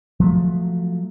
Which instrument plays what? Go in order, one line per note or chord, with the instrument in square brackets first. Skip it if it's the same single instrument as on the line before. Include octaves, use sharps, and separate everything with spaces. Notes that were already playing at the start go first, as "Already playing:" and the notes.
[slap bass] F3 F#3 A3